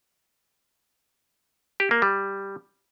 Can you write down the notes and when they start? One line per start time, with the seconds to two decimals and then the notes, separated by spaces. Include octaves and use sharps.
1.80 G4
1.91 A#3
2.02 G3